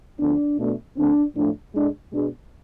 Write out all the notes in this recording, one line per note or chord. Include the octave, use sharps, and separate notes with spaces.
D2 D3 F3 B3 D4
B2 A3 D4
D2 D3 A3 C4 D4
A2 F3 A3 D4
A2 G#3 D4
B2 G#3 D4